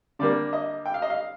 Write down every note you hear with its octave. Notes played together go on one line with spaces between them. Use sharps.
D3 G3 A#3 D5
D#5
G5
F5
D#5
F5